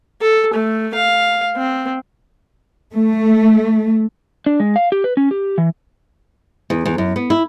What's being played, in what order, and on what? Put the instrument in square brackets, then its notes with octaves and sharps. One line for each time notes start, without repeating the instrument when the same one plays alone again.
[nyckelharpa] A4
A3
F5
C4
[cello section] A3
[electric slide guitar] D4
G#3
F5
G4
B4
C#4
G4
E3
[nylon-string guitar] E2
E2
F#2
B3
E4